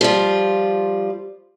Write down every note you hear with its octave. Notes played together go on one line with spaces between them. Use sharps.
F3 G3 F4